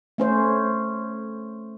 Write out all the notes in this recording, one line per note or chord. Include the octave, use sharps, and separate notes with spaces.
A3 C#4 C5